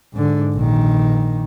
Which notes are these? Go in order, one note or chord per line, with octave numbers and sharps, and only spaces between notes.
G#2 D3
A#1 D#3